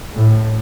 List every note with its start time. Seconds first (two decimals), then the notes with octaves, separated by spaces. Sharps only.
0.16 A2